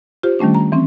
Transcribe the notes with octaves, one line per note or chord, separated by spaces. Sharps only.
F4 G4 C5
D#3 G3 A3 C#4 D4
A#5
E3 C4 C#4